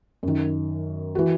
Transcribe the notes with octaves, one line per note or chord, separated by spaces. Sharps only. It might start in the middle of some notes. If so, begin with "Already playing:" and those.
F#2 D#3
E3 F#4